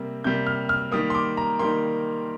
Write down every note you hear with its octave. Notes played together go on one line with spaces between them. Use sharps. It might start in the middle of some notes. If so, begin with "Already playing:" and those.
Already playing: C3 G3 A#3
C3 G3 A#3 G6
F6
F6
D#3 G3 A#3 D#6
C6
D6
A#5
D#3 G3 A#3 C6